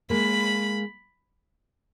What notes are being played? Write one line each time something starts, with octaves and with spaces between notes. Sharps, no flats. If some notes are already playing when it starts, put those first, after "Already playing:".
G#3 A#3 B5